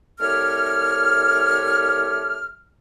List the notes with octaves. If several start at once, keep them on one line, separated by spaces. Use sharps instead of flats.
C2 A3 G4 C#5 F6